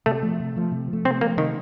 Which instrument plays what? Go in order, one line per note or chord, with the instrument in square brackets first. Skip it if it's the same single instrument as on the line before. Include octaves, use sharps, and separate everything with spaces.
[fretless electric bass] C3 [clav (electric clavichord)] A3
[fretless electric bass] F3 A3
C3
F3 A3
C3
F3
A3
[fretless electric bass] C3 [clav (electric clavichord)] C4
[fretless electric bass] F3 A3 [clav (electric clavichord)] A#3
[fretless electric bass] C3 [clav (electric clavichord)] D#3